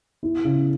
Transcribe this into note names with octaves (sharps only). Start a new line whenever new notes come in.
E4
C#3